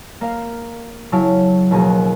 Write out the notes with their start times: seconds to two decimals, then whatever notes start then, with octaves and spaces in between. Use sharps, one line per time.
0.21 A#3 F5
1.12 C#3 F#3 E4 F5 A5
1.71 D#2 B2 F3 A#3 F#4 G#4